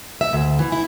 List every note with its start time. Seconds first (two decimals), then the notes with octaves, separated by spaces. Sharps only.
0.21 E5
0.33 D2
0.59 E3
0.72 E4